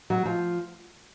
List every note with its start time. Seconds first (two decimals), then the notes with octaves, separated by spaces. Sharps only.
0.10 F#3
0.26 F3